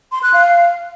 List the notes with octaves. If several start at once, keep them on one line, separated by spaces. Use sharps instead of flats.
C6
F#6
F5